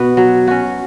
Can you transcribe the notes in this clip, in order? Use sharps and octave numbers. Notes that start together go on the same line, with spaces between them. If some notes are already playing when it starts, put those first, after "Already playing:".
Already playing: B2 B3 F#4
F#3
C#4 F#4